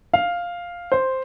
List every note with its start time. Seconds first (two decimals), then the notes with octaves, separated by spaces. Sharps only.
0.14 F5
0.92 C5